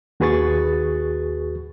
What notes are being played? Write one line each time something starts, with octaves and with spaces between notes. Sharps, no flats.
D#2 F#4 G#4 B4 C#6 A6